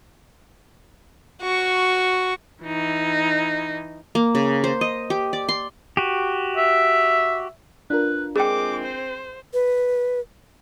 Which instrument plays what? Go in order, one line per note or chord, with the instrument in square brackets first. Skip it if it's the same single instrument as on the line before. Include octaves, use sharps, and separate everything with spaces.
[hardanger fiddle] F#4 C#6
[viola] E3 D#4
[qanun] A#3
C#3
C5
D#5
G4
D5
C6
[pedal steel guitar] F#4 G4
[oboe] E5
[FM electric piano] D4 F4 A#4 [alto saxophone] B4
[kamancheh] G#3 D6 [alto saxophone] C4 [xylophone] G#4 G5
[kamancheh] C5
[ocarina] B4